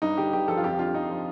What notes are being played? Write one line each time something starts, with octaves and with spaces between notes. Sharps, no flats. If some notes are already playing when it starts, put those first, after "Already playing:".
G2 D#4
D3 G4
G2 G4
F3 A4
F4
F2 G4
D3 F4
F2 D#4
F3